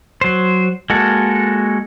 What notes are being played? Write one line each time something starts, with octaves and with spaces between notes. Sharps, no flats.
F#3 C5
G#3 A#3 F#4 A4